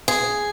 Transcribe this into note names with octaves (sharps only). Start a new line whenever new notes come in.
G#4